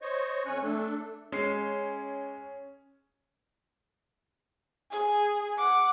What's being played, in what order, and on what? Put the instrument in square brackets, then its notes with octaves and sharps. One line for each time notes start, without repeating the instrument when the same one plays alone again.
[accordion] C5 C#5 D#5 C#6
F2 C#4 C#5 G#5 C#6 F#6
A3 D4 A4
[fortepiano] G#3 [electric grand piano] C#4 C7
[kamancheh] G#4
F#5 D6